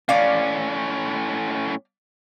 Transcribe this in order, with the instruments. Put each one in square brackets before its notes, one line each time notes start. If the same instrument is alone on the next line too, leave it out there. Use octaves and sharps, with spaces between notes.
[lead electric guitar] A2 C#4 [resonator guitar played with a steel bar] D5 F5